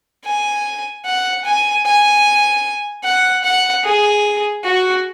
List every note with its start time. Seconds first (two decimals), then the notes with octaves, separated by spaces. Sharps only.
0.25 G#5
1.06 F#5
1.45 G#5
1.85 G#5
3.04 F#5
3.44 F#5
3.84 G#4
4.64 F#4